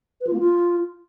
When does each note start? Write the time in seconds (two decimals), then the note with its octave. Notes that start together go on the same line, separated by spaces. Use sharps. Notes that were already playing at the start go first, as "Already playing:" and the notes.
0.21 B4
0.27 F4
0.33 A#3
0.39 F4